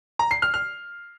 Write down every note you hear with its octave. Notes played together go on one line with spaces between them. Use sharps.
A#5
C7
F6
F6